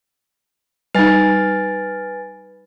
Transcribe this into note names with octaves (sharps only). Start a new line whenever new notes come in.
G3 D#4 B4 G#5 A6